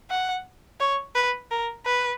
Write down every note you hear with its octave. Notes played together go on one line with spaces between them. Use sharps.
F#5
C#5
B4
A#4
B4